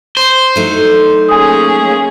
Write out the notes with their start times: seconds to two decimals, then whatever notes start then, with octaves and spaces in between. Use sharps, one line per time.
0.17 C5
0.56 F#3 A3 D#4
1.29 A#3 C#4 G#4 G#5 D#6